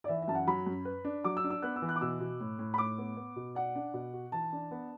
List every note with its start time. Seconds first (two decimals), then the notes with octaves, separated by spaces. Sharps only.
0.04 D5
0.08 E3 E5
0.22 E5
0.28 F#2 A5
0.35 F#5
0.47 F#3 B5
0.67 F#2
0.85 B4
1.05 D4
1.24 F#3 D6
1.37 E6
1.44 D4
1.50 E6
1.62 B3 F#6
1.76 E6
1.82 E3
1.89 F#6
1.96 D6
2.01 B2 E6
2.20 B2
2.40 A2
2.59 A2
2.74 B5
2.78 A2 D6
2.98 B3
3.17 B3
3.36 B2
3.55 D5 F#5
3.76 D4
3.94 B2
4.13 F#4
4.32 E3 A5
4.53 D4
4.71 B3